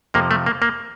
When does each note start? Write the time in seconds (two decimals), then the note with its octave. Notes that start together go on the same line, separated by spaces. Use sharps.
0.14 F2 C3 F3 A#3
0.31 A3
0.46 A#3
0.62 A#3